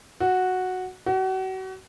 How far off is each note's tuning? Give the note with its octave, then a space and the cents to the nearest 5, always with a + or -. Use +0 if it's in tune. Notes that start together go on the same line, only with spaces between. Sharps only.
F#4 -5
F#4 +35